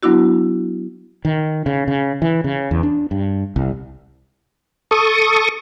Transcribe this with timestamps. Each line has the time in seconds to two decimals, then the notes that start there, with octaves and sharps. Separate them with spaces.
0.03 F#3 B3 D4 E4 F#4
1.25 D#3
1.66 C#3
1.88 C#3
2.22 E3
2.44 C#3
2.71 E2
2.83 D4
3.11 G2
3.56 C2
4.91 A4 C#6 D#6